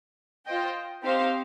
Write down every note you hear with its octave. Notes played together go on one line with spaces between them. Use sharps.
F4 C5 D#5 G5
C4 D#4 G4 C5 F5